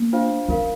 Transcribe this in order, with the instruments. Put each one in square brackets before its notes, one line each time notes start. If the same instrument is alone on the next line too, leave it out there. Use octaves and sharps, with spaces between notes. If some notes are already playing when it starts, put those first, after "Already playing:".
Already playing: [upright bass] A#3
[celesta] D4 F4 C5 F5
[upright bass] C4 [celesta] F4 A#4 F5